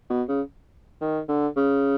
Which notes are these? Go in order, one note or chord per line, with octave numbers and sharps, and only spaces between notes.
B2
C#3
D#3
D3
C#3